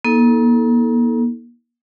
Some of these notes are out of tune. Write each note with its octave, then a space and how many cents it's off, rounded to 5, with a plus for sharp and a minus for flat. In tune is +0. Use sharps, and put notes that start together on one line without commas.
A#3 +40 D#4 +35 A4 -10